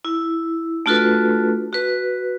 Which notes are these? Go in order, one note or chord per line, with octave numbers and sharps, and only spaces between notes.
E4
A3 D4 F4 F#4 A4 B4
F#4 B4